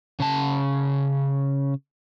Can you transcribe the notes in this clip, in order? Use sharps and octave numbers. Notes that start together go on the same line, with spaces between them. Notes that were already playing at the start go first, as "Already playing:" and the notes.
C#3 A5